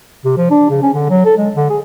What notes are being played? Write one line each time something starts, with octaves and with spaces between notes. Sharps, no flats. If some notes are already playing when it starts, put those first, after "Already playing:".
C3
F3
D4
C#3
C#4
D3
F#3
A4
G#3
D3
G#4